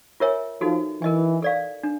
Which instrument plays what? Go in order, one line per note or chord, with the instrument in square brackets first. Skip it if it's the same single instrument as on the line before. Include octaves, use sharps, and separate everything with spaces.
[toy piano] F4 A#4 C#5 E5 G#5
[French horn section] F3 [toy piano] D#4 F#4 A4
[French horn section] E3 [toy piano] A#4 D#5 G#5
[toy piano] A4 D5 F5
D4